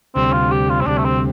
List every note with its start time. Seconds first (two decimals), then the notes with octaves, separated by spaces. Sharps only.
0.15 D2 C3 G3 C4
0.33 F4
0.51 G4
0.69 F4
0.81 C4
0.86 D2 C3 G3 D4
0.97 A3
1.04 C4